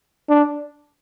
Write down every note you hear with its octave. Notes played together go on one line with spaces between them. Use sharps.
D4